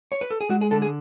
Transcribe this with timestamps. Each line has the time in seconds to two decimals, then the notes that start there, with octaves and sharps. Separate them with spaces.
0.12 C#5
0.21 B4
0.31 A4
0.41 G#4
0.49 G#3 F#4
0.61 G#4
0.71 D3 A4
0.82 G#4